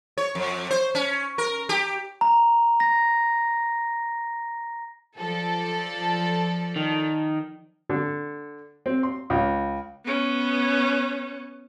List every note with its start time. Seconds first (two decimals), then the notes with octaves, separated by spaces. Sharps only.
0.18 C#5
0.35 F2
0.71 C5
0.95 C#4
1.38 A#4
1.69 G4
2.21 A#5
2.80 A#6
5.17 F3 A4 D5
6.76 D#3
7.89 D3
8.86 C4
9.03 C6
9.30 C#2
10.05 B3 C#4